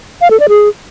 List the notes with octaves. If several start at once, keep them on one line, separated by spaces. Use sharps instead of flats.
F5
A4
D5
G#4